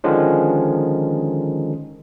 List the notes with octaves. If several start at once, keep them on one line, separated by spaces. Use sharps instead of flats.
D3 D#3 F3 G#3 C#4